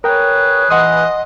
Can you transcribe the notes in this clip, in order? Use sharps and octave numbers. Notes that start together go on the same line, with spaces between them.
G#4 A#4 B4 C#5 G5
E3 D#5 F#5 C6 D#6